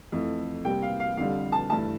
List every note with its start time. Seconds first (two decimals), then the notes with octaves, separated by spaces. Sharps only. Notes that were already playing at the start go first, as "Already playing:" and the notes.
0.12 F2 E3 A3
0.65 C3 G3 A#3 G5
0.82 F5
1.00 F5
1.17 F2 D3 G3 F5
1.52 A5
1.70 G2 E3 A3 A5